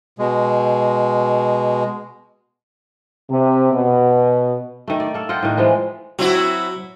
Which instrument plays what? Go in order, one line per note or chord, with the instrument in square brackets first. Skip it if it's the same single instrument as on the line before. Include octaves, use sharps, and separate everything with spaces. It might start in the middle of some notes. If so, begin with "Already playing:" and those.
[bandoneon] B2 G#3
[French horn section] C3
B2
[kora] D#3 A3
D5
A#3 A4
F4 D#5 F#5 G5
A2 D#3
E3 F3 G#3
[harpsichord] F#3 [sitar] C4 E4 F#4